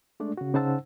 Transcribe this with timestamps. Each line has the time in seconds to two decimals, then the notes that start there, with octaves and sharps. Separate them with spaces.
0.20 G#3 A3 D4 D5
0.37 C#3 F#4
0.54 C#3 D#4 C5 F#5 A5 E6